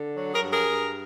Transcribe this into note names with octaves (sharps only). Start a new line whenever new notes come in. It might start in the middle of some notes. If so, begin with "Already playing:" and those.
Already playing: D3
F#3
G#4 A#4
G2
G#4 A#4
G2